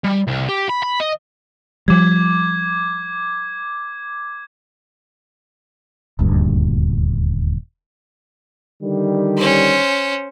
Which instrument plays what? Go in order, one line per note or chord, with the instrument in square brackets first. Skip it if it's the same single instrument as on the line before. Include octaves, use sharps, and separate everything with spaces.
[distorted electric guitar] G3
C2
G4
B5
B5
D#5
[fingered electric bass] F3 G3 [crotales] D6 G#6
[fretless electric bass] D#1 D2 G2
[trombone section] D3 D#3 G3
[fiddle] C#4 C5